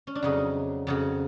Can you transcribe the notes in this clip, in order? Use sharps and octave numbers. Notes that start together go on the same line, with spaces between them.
C#4
D4
F2 C#3 F#3 D#4
F2 C#3 F#3